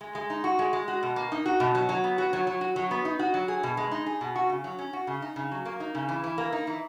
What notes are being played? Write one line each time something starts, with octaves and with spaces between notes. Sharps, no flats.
G#3
G#3
D#4
F#4
G#3
G#3
F#4
B2
A#3
D#4
F#4
B2
F#3
F#3
B3
F#4
F#3
F#3
F#4
F#3
B3
D#4
F#4
F#3
G#4
B2
G#3
D#4
G#4
B2
F#4
C#3
F#3
C#4
F#4
C#3
D#4
C#3
F#3
A#3
D#4
C#3
E3
E3
A#3
D#4
E3